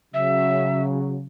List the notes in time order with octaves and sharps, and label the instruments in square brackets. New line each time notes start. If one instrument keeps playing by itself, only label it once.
[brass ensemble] C#3 F#3 [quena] E5